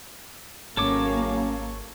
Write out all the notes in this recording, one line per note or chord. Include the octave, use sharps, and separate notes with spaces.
G#1 C#3 F#3 A#3 C#4 A4 C#5 D6